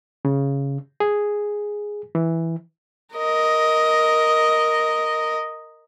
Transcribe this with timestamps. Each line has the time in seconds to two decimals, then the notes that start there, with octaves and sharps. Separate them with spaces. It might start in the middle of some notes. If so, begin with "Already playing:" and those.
0.25 C#3
1.00 G#4
2.15 E3
3.15 A#4 D#5